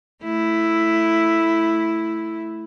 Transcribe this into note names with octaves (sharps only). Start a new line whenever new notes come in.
A3 E4